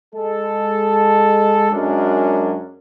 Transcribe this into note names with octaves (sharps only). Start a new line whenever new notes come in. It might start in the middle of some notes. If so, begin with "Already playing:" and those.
G#3 A4
F#2 F#3 G#3 C#4 D4 A#4